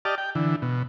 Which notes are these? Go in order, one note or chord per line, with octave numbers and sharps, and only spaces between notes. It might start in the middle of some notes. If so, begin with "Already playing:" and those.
G4 D5 D#5 A5 F6
G5
D3 E3
B2